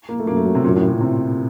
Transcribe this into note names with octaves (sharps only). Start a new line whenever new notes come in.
A#3
A3
F#2 A#3
A3
F#3
C3
F#2 A#2
A2
A#2
C3